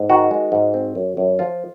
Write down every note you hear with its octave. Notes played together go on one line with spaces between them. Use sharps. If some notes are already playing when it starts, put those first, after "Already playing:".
Already playing: G#2
D#3 F#4
G#3
G#2
C4
F#2
F#2
F3 F4